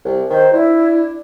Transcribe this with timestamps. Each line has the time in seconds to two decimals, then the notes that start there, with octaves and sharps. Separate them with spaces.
0.05 C2
0.30 D#3 C5
0.53 D4 E4